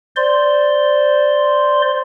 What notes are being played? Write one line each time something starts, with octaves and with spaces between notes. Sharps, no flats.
C5 D5 C6